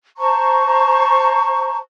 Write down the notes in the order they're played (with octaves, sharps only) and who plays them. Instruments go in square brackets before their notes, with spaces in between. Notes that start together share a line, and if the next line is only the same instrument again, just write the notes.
[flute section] C5 A5 A#5 C#6